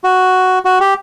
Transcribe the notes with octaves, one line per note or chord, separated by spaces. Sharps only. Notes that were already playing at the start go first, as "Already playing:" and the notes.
F#4
F#4
G4